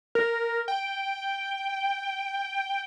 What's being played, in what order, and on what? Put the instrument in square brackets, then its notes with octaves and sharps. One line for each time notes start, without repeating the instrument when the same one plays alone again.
[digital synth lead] A#4
G5